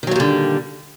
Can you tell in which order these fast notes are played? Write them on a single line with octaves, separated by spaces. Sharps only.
D#3 F#3 A#2 G3 D3